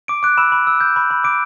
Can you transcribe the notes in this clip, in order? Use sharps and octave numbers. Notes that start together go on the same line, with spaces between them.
D6 D7
D6 F#6 D7
B5 E6 E7
B5
E6
G6
B5
B5
D6 D7